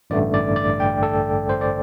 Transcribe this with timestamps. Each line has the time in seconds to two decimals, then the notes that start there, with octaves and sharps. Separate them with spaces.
0.10 A1 G2 D3 A3 D5
0.34 D5
0.56 D5
0.80 G5
1.03 A4
1.49 C5
1.61 D5